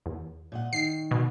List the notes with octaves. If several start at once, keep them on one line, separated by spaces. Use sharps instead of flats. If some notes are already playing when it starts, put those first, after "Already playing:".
E2
A#2 D#5 F#5
D#3 C7
B2